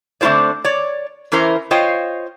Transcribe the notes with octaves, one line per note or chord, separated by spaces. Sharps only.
D3 A3 C4 F4 C5 D5
C#5 D5
E3 C#4 E4 A#4 C5
F4 C5 C#5 D#5 F5 G5